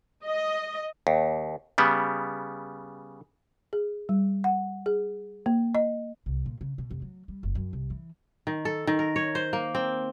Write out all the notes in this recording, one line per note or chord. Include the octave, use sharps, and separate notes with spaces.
D#5
D#2
C#3 G3 B3
G#4
G3
F#5
G#4
A#3
D#5
C2
A#2
C#3
B2
F1
F#3
G3
F#1
F#2
C2
E3
D#3
A4
D#3
A#4
C#5
C5
A#3
C4